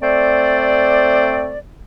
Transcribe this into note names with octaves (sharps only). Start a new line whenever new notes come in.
A3 C4 C5 D5